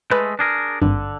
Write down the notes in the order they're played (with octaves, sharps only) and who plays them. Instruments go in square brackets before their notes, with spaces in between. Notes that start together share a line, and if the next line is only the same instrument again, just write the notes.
[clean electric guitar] G#3 A3 [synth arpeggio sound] B4
[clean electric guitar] D4 G#4 A#4
[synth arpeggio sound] G#1 G2 [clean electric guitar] D3